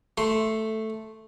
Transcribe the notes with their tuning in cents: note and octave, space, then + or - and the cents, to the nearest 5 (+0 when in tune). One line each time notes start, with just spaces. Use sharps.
A3 +0 C6 +0